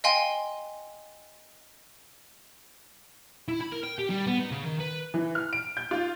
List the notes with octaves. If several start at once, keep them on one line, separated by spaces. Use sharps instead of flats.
D#5 F5 G5 G#5 C6 G7
E4
B5
A#4
G5
G4
G3
B3
D#4
C#3
D#3
B4
E3
F6
D7
G6
F4